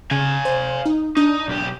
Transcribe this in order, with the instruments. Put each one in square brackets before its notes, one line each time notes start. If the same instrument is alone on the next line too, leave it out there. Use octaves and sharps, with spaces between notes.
[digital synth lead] C#3 [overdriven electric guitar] F5 G#5
[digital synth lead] C5
D#4
[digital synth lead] D4 [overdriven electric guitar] D#4
[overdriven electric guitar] B1 G4